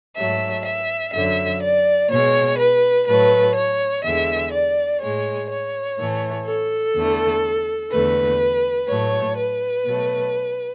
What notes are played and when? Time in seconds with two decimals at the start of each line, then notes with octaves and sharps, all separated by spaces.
0.17 G#2 F#3 A3 E5
0.65 E5
1.14 F#2 D3 F#3 E5
1.63 D5
2.11 B2 G#3 C#5
2.59 B4
3.07 A2 F#3 A3 B4
3.56 C#5
4.04 E2 D3 G#3 E5
4.53 D5
5.01 A2 G#3 C#5
5.50 C#5
5.98 A2 E3 A3
6.47 A4
6.95 E2 D3 A3
7.92 E2 D3 A3 B4
8.88 A2 F#3 A3 C#5
9.37 B4
9.85 B2 F#3 A3